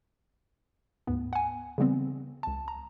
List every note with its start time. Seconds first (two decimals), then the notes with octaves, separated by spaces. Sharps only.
1.07 D2 G#2 B3
1.33 F#5 G#5
1.78 C#3 E3 G3 B3 C4
2.43 C#2 A5
2.68 A#5